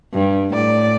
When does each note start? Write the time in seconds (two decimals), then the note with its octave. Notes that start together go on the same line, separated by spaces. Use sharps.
0.13 G2
0.54 A2 D5